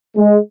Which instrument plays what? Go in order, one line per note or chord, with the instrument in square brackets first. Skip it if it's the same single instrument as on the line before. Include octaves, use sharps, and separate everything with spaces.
[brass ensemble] G#3